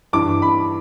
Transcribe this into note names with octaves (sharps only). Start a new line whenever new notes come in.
G2 E3 D6
B5